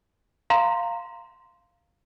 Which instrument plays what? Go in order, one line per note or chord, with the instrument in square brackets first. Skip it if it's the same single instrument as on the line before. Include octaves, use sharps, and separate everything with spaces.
[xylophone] F5 A#5 C6